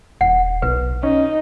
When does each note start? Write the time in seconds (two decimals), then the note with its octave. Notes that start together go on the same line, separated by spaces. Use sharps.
0.21 D#1 F#5
0.62 B1 B4
1.03 C#4 D#4